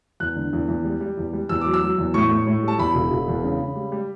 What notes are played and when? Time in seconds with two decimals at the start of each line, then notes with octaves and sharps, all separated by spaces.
0.20 E2 F#6
0.36 D3
0.53 E2
0.68 E2
0.85 G3
1.00 G3
1.17 E2
1.33 G3
1.49 E2 E6
1.61 F#3 D6
1.74 E6
1.82 F#3
1.98 E2
2.14 A2 C#6
2.31 A2
2.47 A2
2.63 G3 A5
2.78 E2 B5
2.95 E1
3.11 E1
3.28 E2
3.44 C#3
3.60 C#3
3.75 G3
3.92 G3